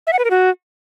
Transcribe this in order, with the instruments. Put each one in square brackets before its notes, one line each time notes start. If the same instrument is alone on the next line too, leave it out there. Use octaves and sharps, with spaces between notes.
[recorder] E5
F#5
B4
A#4
F#4